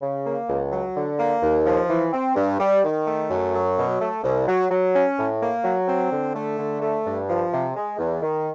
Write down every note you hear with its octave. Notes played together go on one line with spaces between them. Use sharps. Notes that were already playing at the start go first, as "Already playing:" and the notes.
C#3
A#3
C#2
F#3
D3
A#3
D#2
F3
E3
C4
G2
G3
D#3
A3
F#2
F#3
B2
A3
C2
F#3
F#3
C#4
A2
A#3
F#3
C4
D3
A3
D3
A3
G2
F3
C3
G#3
E2
D#3